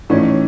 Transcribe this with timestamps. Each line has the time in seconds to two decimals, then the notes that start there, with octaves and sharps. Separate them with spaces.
0.09 A2 E3 C#4 D#4